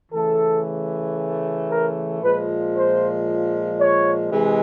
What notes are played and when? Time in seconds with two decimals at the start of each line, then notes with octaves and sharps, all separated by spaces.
0.12 C#3 E3 A3 A4
1.69 A#4
2.22 A#2 F3 G#3 B4
2.74 C5
3.79 C#5
4.31 C3 E3 G#3